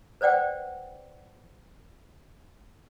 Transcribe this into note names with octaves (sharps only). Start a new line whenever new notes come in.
B4 C5 D5 F#5 G5